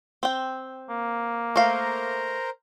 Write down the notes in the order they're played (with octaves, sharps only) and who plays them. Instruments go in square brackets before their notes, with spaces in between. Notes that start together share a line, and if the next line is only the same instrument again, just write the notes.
[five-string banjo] C4 G5
[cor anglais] A#3
[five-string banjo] A3 F5 [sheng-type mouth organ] A#4 C5 A#5